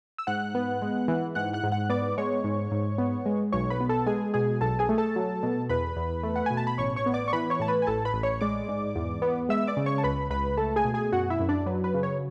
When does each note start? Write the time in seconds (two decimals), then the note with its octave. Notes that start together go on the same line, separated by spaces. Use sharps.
0.18 E6
0.27 G#2 F#5 F#6
0.55 B3
0.82 G#3
1.08 E3
1.35 G#2 F#5 F#6
1.53 F#5 F#6
1.64 G#2
1.72 F#5 F#6
1.90 B3 D5 D6
2.18 G#3 C#5 C#6
2.44 G#2
2.71 G#2
2.98 B3
3.26 G#3
3.52 B1 C#5 C#6
3.70 B4 B5
3.81 B3
3.89 A4 A5
4.07 G#3 G#4 G#5
4.34 B2 G#4 G#5
4.61 B1 A4 A5
4.79 G#4 G#5
4.89 A3
4.98 A4 A5
5.16 F#3
5.43 B2
5.69 E2 B4 B5
5.96 E2
6.23 A3
6.36 F#5
6.46 B2 G#5
6.57 A5
6.67 B5
6.78 A1 C#5 C#6
6.96 C#5 C#6
7.06 B3
7.14 D5 D6
7.28 C#6
7.33 E3 B4 B5
7.50 C#5 C#6
7.60 A2 A5
7.68 B4 B5
7.82 G#5
7.87 A1 A4 A5
8.05 B4 B5
8.13 A1
8.23 C#5 C#6
8.41 G#3 D5 D6
8.68 G#2
8.96 E2
9.22 B3
9.49 G#3 E5 E6
9.67 D5 D6
9.77 C#3
9.86 C#5 C#6
9.98 A5
10.03 C#2 B4 B5
10.30 C#2 B4 B5
10.57 A3 A4 A5
10.76 G#4 G#5
10.85 B2
10.94 G#4 G#5
11.12 F#2 F#4 F#5
11.30 E4 E5
11.40 F#2
11.49 D4 D5
11.66 F#3 B4
11.84 B4
11.94 C#3
12.03 C#5